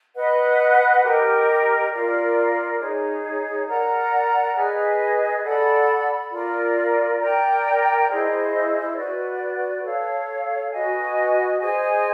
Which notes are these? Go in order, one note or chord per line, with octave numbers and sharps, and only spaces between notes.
B4 D#5 F#5
G4 A#4 D#5
F4 A#4 D5
D#4 G#4 C#5
A#4 D5 F#5 A#5
G#4 B4 D#5 G#5
A4 D5 F#5 B5
F4 A#4 D5
A#4 D5 G5 A#5
E4 G#4 C5 D#5
F#4 B4 D5
A4 C#5 F5
F#4 B4 D#5 G#5
G#4 C5 D#5 G#5